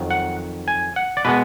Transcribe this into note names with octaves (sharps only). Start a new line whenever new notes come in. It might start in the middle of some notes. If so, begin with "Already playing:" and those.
Already playing: F2 D#3 F#3
F#5
G#5
F#5
D5
B2 G#3 B3 B4